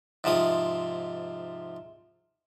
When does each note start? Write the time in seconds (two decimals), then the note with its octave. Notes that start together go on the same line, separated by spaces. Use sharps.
0.24 G#2 C3 F3 D#6